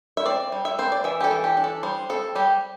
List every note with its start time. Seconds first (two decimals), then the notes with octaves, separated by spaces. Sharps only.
0.17 E5
0.26 C4 D5
0.52 G3
0.65 E5
0.79 C4 C5
0.92 D5
1.04 E3 E5
1.20 G4
1.24 A4
1.31 E3
1.44 G4
1.57 D4
1.64 A4
1.83 G3 C5
2.10 C4 A4
2.35 G3 G4